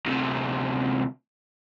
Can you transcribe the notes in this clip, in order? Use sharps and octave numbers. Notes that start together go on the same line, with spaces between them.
D2 C3